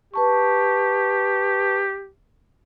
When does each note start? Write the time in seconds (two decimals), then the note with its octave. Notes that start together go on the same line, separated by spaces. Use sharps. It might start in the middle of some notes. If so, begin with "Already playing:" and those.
0.14 G4 B4 A5 C#6